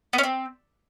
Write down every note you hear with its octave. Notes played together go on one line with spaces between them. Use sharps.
B3
C#4
C4